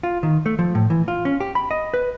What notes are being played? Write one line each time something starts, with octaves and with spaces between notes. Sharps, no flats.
F4
D#3
A3
F3
A2
E3
F4
C#4
G4
B5
D#5
B4